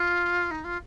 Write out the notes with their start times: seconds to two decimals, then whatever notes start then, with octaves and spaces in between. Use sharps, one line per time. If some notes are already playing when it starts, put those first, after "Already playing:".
Already playing: F4
0.51 D#4
0.64 F4